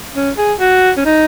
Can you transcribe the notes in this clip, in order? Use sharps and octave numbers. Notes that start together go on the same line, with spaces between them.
C#4
G#4
F#4
C#4
D#4